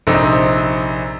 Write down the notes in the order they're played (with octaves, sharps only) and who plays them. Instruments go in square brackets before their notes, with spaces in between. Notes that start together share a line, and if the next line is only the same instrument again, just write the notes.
[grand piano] A#1 C3 C4 D#4